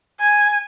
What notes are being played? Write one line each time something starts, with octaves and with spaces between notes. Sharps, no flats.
G#5